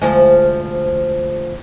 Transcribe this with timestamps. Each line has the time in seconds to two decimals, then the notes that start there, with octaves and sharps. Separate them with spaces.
0.01 D2 F3 G#3